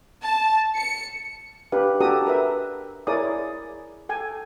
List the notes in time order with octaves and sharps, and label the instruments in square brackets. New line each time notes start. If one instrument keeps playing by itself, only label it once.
[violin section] A5
C#7
[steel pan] D4 G4 B4 F5
D4 F#4 G4 A4 A#5 D#6
A#4 B4 E5
E4 G#4 A#4 C#5 D5 D#6
A4 G5 G#5